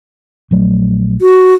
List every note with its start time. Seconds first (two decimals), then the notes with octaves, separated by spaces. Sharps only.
0.51 A#1 F#3 A3
1.21 F#4